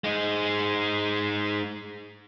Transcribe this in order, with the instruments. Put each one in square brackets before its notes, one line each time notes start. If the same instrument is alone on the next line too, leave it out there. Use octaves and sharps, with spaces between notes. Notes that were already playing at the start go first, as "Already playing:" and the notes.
[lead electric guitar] G#3 D#4